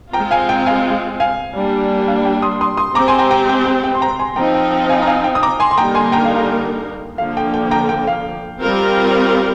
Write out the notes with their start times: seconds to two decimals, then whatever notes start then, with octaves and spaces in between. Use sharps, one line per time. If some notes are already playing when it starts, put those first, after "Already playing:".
0.13 G#3 C4 F4 G5 A#5
0.31 F5 G#5
0.49 G5
0.66 F5 G#5
1.20 F5 G#5
1.55 G3 A#3 D4
2.08 F5
2.25 G5
2.42 C6 D#6
2.61 C6 D#6
2.77 C6 D#6
2.95 G#3 C4 G4 C5 A#5 D6
3.08 G#5 C6
3.19 G5 A#5
3.31 G5 A#5
3.49 G5
3.66 G5
3.84 G5
3.95 C6
4.01 G5 A#5
4.19 G#5 C6
4.36 F3 C4 D#4 G5 A#5
4.54 G5
4.71 G5
4.89 F5 G#5
5.02 A#5
5.07 F5 G#5
5.24 G5
5.35 D#6
5.43 A#5 D6
5.60 G#5 C6
5.71 C6
5.77 D3 G3 A#3 D#4 A#4 G5 A#5
5.95 G#5 C6
6.12 G5 A#5
6.25 F5
6.36 F5
7.18 D3 F3 A#3 F5
7.37 G5
7.54 G5
7.71 G5 A#5
7.89 G5
8.07 F5
8.60 G3 C4 F4 A#4